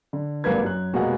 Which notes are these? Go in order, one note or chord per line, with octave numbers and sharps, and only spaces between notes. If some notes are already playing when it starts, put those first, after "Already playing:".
D3
G#1 G2 A#3 A#4 B4 G#6
F#2 F#6
F1 B2 G#3 A#3 B3 F#5